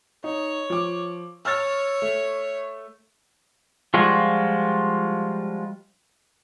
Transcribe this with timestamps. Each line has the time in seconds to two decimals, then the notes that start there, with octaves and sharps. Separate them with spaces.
0.24 D#4 C#5
0.70 F3 D6
1.45 C#5 E6 F6 A6
2.02 A3
3.94 F3 G3 G#3 F4 F#4